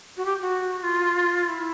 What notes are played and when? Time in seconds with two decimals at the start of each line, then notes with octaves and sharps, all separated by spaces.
0.17 F#4
0.25 G4
0.42 F#4
0.83 F4
1.49 E4